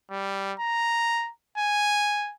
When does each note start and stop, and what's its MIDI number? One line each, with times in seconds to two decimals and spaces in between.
0.11 0.53 55
0.60 1.30 82
1.58 2.32 80